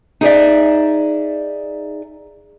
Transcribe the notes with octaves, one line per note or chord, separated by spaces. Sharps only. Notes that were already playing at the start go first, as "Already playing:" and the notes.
D#4 G#4 D5 E5